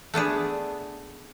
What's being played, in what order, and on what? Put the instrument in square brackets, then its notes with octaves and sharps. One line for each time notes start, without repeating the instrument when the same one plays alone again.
[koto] A3 B3 D4 G#4